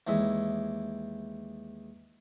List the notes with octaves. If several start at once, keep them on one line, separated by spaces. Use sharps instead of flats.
D#2 E3 G#3 E5 G#5